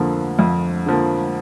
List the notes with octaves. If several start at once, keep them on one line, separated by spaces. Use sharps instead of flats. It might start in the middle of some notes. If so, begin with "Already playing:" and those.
Already playing: F2 D3 F3 A#3
F2
D3 F3 A#3